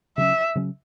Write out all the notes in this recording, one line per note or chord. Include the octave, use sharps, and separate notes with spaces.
C#3 F#3 C#4 E5
C#3 F#3 C#4